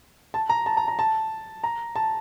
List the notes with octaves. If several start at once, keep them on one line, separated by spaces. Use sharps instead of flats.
A5
A#5
A5
A#5
A#5
A5
A#5
A5